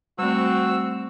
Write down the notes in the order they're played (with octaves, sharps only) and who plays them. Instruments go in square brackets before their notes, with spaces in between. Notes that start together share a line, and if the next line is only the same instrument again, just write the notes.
[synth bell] G3 A3 [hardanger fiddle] C4 [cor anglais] F#4 [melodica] E6